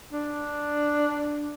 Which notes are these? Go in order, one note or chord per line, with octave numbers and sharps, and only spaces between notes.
D4